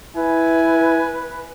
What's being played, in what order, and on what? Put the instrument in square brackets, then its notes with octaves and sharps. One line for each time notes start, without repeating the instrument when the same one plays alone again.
[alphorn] E4 [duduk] B4 [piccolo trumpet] G#5